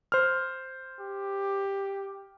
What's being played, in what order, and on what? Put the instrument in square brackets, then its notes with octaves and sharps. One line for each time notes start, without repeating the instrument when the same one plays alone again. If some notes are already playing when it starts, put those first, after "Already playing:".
[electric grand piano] C5 F6
[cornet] G4